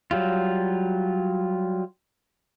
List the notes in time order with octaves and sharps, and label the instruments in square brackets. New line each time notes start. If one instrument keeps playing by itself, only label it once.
[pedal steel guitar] F#3 G3 F4